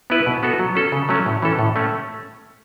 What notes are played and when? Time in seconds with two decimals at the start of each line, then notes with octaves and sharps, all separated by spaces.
0.10 B3 E4 B4
0.26 B2
0.43 B3 F#4 A4
0.59 F#3
0.75 C#4 A4
0.92 C#3
1.09 F#3 A3 C#4
1.26 A2
1.42 E3 C#4 A4
1.59 A2
1.76 A3 C#4